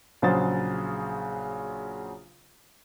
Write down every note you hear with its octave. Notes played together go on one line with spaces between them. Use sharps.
A#1 C#3 F#3 C5 A6